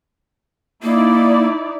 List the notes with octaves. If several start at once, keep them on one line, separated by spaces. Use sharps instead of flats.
A#3 D#4 E4 D5